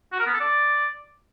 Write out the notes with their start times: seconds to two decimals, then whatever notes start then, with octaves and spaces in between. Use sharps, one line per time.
0.12 F#4
0.19 A#4
0.26 B3
0.33 A4
0.40 D5